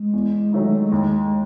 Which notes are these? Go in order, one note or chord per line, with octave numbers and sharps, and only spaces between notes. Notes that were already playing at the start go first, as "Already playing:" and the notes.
Already playing: G#3
E2
D#3 F#3 A3 D#4
D#2